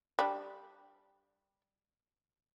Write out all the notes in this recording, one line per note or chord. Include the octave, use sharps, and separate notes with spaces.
G3 D4